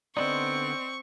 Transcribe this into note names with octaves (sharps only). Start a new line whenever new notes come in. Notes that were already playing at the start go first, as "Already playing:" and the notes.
D3 B3 C4 D#4 D5 D#5 C6 C#6